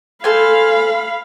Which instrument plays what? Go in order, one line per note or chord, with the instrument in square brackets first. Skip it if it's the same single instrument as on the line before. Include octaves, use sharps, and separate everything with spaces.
[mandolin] A4 C5 G#5 [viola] F5 B5